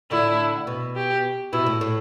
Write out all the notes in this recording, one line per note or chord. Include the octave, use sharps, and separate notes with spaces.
A2 D3 E4
B2
G4
B2 E4
A2
A2